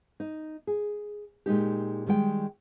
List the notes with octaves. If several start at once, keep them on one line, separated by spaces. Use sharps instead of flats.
D#4
G#4
A#2 G#3 D#4 G4
D#3 G3 G#3 G5